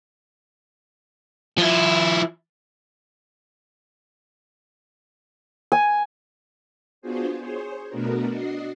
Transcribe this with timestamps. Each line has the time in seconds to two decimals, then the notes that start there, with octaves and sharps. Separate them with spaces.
1.58 F3 E4
5.72 G#5
7.02 B3 D4 F4 F#4 G#4 C5
7.40 G#4 C5 C#5
7.89 B2 A3 B3 D4 F#4 A#4
8.29 D4 F#4 D#5 C7